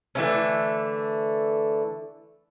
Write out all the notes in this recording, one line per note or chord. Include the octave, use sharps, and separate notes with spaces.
D3 E3 A3 C#4